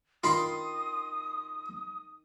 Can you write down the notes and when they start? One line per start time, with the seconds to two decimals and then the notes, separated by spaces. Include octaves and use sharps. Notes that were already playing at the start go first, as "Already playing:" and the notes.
0.24 D#3 F4 B5 C6 D#6